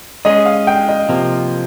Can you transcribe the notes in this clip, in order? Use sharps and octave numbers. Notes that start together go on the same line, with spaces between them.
G#3 C#4 G#4 D#5
F5
G5
D#5
C3 F3 A#3